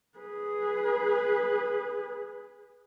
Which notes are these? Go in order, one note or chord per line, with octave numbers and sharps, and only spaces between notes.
G#4 B4